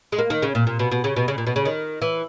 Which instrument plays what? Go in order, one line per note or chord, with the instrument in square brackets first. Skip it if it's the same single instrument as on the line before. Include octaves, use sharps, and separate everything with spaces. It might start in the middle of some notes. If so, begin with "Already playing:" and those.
[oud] G#3
A#3
D#3
C#3
A#2
A#2
B2
B2
C#3
B2
C#3
A#2
B2
C#3
D#3
E3